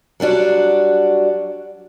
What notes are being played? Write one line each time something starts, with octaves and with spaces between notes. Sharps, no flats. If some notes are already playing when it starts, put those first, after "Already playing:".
F#3 G3 D4 F#4